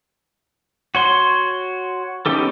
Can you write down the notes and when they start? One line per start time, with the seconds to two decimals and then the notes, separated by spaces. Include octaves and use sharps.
0.95 F#4 C#5 C6
2.26 B3 C#4 D#4 G4 A4